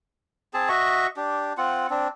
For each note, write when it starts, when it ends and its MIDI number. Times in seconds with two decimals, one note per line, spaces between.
0.54 0.69 60
0.54 0.69 68
0.54 0.69 81
0.69 1.07 66
0.69 1.07 75
0.69 1.07 76
0.69 1.07 85
1.17 1.53 62
1.17 1.53 67
1.58 1.87 60
1.58 1.87 65
1.58 1.87 78
1.90 2.08 60
1.90 2.08 62